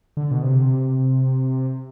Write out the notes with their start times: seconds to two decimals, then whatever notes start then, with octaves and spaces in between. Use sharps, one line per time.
0.17 D3
0.31 B2
0.43 C3